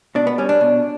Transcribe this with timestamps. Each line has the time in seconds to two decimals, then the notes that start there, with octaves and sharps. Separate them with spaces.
0.15 B2 D4
0.27 B3
0.38 G3 C#4
0.49 D4
0.61 B2